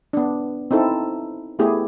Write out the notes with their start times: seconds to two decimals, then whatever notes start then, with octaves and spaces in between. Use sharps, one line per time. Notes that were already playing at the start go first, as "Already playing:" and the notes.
0.13 B3 D4
0.71 C4 D#4 E4 A4
1.59 A3 B3 E4 G4 G#4